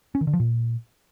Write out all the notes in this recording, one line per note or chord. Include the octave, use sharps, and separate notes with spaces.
C#4
D#3
D3
F3
A#2